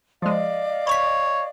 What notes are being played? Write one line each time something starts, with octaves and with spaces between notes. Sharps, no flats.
F3 G#3 D5 D#5 F5
C#5 B5 C#6 B6